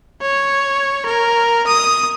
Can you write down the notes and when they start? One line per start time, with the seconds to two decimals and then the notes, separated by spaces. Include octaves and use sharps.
0.22 C#5
1.06 A#4
1.67 D#6